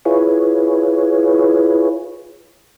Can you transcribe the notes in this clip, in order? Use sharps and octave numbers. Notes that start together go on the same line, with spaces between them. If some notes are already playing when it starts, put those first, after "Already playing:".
E4 F4 G#4 B4 C#5